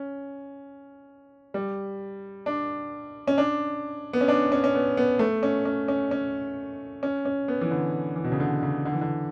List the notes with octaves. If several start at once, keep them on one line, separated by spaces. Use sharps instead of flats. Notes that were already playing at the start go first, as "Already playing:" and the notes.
Already playing: C#4
G3
D4
C#4
D4
B3
C#4
D4
C#4
C#4
B3
B3
A3
C#4
C#4
C#4
C#4
C#4
C#4
B3
E3
D3
E3
B2
C#3
D3
C#3
D3
E3
D3